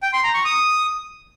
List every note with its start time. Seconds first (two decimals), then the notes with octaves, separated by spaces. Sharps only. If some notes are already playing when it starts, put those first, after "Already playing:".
0.03 G5
0.13 C6
0.24 A#5
0.34 C#6
0.45 D#6